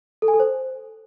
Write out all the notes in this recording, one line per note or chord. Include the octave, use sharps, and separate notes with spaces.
A4
G#5
A4
C5